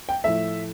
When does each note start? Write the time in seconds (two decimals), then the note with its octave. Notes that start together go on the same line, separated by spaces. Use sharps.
0.09 G5
0.24 A2 F3 A3 E5